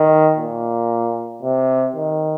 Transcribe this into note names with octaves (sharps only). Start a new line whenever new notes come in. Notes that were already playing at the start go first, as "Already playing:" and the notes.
Already playing: D#3
A#2
C3
D#3